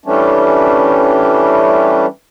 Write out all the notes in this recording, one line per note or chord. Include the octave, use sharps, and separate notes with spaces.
E3 G3 A3 C#4 D4